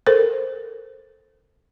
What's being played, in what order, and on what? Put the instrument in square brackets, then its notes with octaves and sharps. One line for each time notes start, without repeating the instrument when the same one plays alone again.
[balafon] A4 A#4 C5